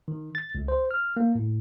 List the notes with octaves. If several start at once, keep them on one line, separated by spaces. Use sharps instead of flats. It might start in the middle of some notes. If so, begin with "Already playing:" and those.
D#3
A6
C#2
C5
F6
A#3
A2